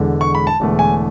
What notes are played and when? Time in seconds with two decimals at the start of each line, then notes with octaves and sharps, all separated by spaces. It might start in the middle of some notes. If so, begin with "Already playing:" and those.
Already playing: E1 E2 D3 G#3
0.21 C#6
0.35 B5
0.47 A5
0.60 E1 E2 D3 A3
0.79 G#5